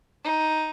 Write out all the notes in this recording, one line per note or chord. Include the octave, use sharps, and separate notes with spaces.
D#4